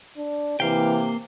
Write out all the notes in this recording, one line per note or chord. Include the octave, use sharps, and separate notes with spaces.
D4
C3 E3 A#3 F5 G5